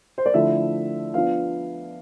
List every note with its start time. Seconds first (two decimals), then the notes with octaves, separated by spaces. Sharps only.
0.18 C5
0.26 D5
0.34 D3 F3 A3 E4 E5
1.14 F3 B3 D4 F4 F5